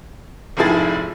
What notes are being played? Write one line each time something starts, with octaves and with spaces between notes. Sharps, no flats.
F1 G#2 F3 E4 G#4 A6